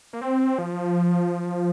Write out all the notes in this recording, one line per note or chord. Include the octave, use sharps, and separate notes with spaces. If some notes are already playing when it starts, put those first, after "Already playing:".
A#3
C4
F3